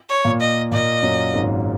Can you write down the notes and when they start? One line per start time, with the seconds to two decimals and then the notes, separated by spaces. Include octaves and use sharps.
0.09 C#5
0.25 A#2 A#3
0.40 D#5
0.71 A#2 A#3 D#5
1.03 F#2 F#3
1.34 G#1 G#2